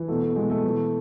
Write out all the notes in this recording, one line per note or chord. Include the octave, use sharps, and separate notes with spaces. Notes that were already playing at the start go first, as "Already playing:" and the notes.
Already playing: E3
B2 A3
A3
B2 G#3
A3
E3